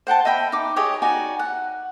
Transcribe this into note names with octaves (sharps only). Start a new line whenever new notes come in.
C5 F#5 G5 A5
D#5 E5 G5 B5
D#4 D6
G4 G#4 C#5 D#5
D#4 F#4 D5 G#5
F#5